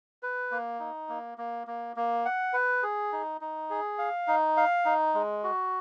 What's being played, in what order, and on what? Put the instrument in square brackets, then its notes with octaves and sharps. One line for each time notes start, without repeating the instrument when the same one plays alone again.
[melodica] B4
A#3
D#4
A#3
A#3
A#3
A#3
F#5
B4
G#4
D#4
D#4
G#4
F5
D#4
F5
D#4
G#3
F#4